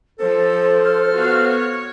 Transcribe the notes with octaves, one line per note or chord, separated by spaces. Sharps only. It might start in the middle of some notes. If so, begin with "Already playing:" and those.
F3 A4 C5
F6
B3 F#4 F5
C#5